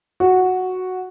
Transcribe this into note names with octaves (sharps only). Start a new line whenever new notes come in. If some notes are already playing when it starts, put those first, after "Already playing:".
F#4